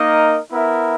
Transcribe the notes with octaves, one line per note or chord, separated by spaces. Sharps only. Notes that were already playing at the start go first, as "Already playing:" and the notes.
Already playing: A#3 D#4 A#4 D#5
B3 E4 A#4 E5